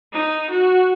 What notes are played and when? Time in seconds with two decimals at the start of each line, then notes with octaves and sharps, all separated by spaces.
0.13 D#4
0.50 F#4